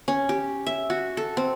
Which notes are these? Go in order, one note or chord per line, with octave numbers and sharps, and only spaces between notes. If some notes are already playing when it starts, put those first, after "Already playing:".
C#4
G4
E5
F#4
A4
C4